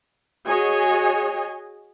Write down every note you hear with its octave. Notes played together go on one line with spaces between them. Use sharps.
F#4 G#4 C#5 D#5 G#5